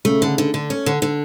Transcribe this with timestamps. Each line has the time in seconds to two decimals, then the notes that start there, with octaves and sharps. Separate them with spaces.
0.05 C#3 A3
0.22 D3
0.38 D3
0.54 D3
0.70 C#4
0.86 D3
1.02 D3